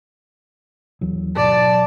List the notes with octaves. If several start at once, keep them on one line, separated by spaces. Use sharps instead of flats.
D#2 E3 F#3
G#2 B2 F#3 D5 A5